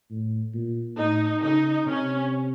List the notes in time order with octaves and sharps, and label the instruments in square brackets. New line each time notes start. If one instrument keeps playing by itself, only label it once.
[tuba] A2
A#2
[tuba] A2 [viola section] D#4
[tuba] C#3 [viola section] D#4
[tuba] C3 [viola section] C#4